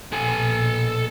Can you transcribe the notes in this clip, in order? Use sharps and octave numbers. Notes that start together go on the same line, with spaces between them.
A#1 B2 A4 G#5